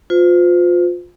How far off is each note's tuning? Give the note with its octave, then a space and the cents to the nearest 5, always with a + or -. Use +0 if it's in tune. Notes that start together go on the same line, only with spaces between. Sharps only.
F4 +25 C5 -40